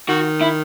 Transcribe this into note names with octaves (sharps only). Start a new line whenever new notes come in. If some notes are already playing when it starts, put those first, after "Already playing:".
D#3 F#4
E4